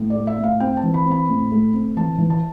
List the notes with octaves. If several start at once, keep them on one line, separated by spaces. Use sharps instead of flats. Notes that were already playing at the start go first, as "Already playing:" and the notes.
Already playing: A2
D5
A3
E5
A2
F5
C4 G5
A5
E3
B5
C4
B5
A2
A3
C4
E3 A5
E3
A5